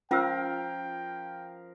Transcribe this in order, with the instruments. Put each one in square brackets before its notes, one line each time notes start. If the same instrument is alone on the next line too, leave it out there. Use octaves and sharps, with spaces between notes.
[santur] F3 A#4 F5 [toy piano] C#4 F4 E6 [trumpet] G5